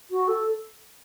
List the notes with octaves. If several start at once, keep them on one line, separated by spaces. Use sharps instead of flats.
F#4
A4